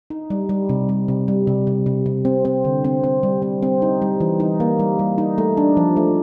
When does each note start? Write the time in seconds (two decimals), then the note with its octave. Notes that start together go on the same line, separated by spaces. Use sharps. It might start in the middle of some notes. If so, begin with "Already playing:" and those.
0.10 D#4
0.30 G3
0.49 G3
0.69 C3
0.89 G3
1.08 C3
1.28 G3
1.47 C3
1.67 C3
1.86 C3
2.06 C3
2.25 C4
2.45 C4
2.65 D3
2.84 C4
3.04 C4
3.23 G3
3.42 C4
3.63 C4
3.82 D#4
4.02 G3
4.20 E3
4.40 D#4
4.60 A#3
4.79 G3
4.99 G3
5.18 D#4
5.38 A3
5.57 D4
5.77 F3
5.97 A3